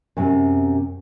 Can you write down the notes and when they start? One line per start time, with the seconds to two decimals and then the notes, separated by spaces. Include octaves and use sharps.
0.17 F#2 C3 C4